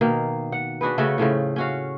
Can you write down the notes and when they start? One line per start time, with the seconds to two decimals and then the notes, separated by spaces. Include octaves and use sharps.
0.01 B2 D#3 A#3
0.52 F#5
0.81 D4 F#4 G#4 B4
0.98 C#3 A3 F#4 A4
1.18 A2 C#3 F3 A3
1.56 C#4 F#4 F5